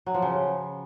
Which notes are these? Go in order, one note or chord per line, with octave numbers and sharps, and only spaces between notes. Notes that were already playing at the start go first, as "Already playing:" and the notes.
F#3
F3
C#3